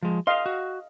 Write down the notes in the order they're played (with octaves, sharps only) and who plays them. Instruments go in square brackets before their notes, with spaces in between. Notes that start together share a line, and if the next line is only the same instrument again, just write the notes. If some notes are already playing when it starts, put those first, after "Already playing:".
[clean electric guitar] F3 G#3
[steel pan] D#5 F5 [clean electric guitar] C6
[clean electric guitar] F#4